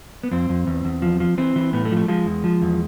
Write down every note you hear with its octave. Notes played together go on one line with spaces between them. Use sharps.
B3
F2 C4
F2
E2
E2
F3
F3
E3 C4
E3
A2 B3
A3
F3
A3
F3 G#3
E2
F3
E2